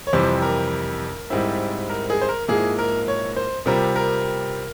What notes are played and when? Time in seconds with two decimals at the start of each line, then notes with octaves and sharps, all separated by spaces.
0.07 C#5
0.13 F2 C3 E3 G3 C5
0.42 A#4
1.30 G#2 G3 C4 E4
1.90 A#4
2.10 G#4
2.21 C5
2.29 A#4
2.48 G#2 F3 A#3 E4 G#4
2.79 A#4
3.08 C#5
3.36 C5
3.66 C3 G3 C4 F4 A#4
3.96 A#4